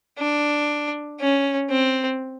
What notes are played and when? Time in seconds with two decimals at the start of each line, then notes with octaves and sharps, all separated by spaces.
0.18 D4
1.20 C#4
1.70 C4